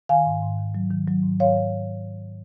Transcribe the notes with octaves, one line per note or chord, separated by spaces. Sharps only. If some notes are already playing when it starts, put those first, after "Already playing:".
D#3 F5 G#5
G#2
G#2
D#3
F#3
D#3
F#3
G#2
G#2 C#5 F5
F#3